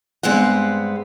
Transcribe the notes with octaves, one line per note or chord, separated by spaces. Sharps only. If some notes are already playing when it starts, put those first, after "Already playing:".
G2 G#3 B3 C4 F#5